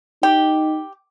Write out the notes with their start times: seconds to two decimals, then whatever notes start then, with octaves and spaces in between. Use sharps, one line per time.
0.23 D#4 G4